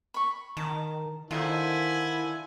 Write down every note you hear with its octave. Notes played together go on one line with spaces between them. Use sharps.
B5 C#6
D#3 A5 A#5
D3 D#3 E4 F4 A4 C5 G#5